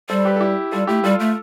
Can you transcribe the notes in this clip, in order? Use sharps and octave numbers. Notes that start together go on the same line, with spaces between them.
G3 A4 C5
G4 B4
A4
E4 G4
G3 F4 A4
A3 E4 G4
G3 F4 A4
A3